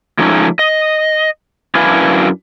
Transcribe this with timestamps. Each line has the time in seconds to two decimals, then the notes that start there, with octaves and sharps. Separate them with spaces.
0.19 F3 G#3 A3 C#4 D#4
0.59 D#5
1.75 F#2 D4 E4 B4 F5 G#5